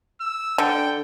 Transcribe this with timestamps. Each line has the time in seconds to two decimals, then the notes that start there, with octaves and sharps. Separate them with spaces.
0.21 E6
0.58 D3 G5